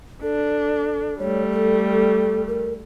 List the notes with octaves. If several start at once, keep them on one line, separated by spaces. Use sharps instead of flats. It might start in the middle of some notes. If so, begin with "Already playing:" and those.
D4 A4
G3 A3 C#5
A4
A#4